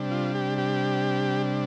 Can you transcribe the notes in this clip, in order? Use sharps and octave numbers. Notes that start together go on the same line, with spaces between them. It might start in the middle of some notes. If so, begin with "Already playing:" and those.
Already playing: C3 G3 D4
F4
G4
G4